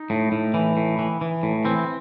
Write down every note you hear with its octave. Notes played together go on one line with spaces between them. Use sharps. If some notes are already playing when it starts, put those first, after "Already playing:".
Already playing: D#4
A2
A2
E3
A2
E3
E3
A2
E3 C4